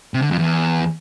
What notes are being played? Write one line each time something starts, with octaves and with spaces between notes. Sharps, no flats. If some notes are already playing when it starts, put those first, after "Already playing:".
C3
D3
F2
E2